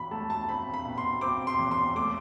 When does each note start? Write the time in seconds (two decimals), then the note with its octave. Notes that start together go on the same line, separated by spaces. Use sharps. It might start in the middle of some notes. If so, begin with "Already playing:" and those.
Already playing: E2 B2 B5
0.11 A3 A5
0.30 A5
0.49 C4 B5
0.74 B5
0.85 B2
0.98 C6
1.21 C4 D6
1.47 C6
1.59 E2
1.71 C6
1.95 A3 D6